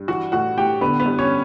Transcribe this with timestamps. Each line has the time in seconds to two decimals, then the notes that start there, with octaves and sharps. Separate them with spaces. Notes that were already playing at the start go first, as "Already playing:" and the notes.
Already playing: G2
0.08 E3 F#4 F#5
0.32 A2 F#4 F#5
0.57 A2 G4 G5
0.81 D3 B3 B4
1.00 B3 B4
1.06 G2
1.19 C#4 C#5